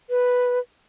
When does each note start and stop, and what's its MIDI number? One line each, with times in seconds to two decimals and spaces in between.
0.10 0.59 71